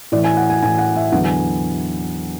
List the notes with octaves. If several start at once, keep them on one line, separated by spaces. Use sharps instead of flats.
A2 E3 D5
G#5
F#5
G#5
A2 E3 G#5
F#5
E5
E2 D3 F#3 F#5
G#5